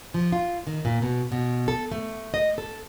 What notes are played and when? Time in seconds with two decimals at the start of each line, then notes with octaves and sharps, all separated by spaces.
0.14 F3
0.32 F4
0.67 D#3
0.85 A#2
1.02 B2
1.32 B2
1.68 A4
1.92 A3
2.34 D#5
2.58 A4